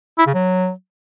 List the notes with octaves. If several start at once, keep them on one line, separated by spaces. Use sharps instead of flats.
E4
C#3
F#3